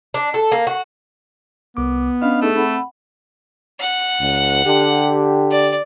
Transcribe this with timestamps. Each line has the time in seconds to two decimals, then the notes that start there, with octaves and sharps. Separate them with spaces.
0.14 D4
0.34 A4
0.52 A#3
0.67 F#4
1.77 C2 B3 D6
2.22 C#4 D4 D#5 F5 B5
2.41 A3 D#4 G#4 A4
2.56 C4 F#5 B5
3.80 F#5
4.20 C#2
4.64 D3 G4
5.51 D5